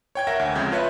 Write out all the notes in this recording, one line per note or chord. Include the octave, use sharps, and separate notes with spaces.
C#5 G5 G#6
A#4 E5 F#5 A#6
D2
F2 C#3 G#3 G6
F4 B4 C#5 E5